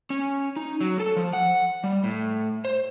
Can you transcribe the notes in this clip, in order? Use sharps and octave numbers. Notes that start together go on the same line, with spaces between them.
C#4
D#4
F#3
A4
F3
F#5
G3
A2
C5